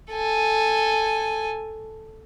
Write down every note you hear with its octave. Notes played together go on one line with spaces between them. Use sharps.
A4 G#5